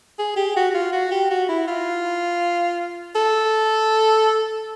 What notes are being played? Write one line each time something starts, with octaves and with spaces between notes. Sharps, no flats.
G#4
G4
F#4
F#4
F4
F#4
G4
F#4
E4
F4
A4